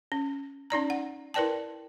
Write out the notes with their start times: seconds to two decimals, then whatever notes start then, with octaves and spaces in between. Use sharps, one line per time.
0.12 C#4
0.70 C#4 D#4 D5 A#5
0.90 F#5
1.34 E4 A#4 B4 D5 G5 A5